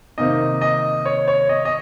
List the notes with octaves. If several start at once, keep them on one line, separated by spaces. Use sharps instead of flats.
C3 D#3 A#3 D#4 D#5
D#5
C#5
C#5
D#5
D#5